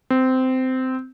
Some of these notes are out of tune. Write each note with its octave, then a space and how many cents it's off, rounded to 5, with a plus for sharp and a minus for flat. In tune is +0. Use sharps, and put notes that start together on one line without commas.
C4 -15